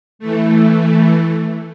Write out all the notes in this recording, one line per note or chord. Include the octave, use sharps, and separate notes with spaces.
E3 A3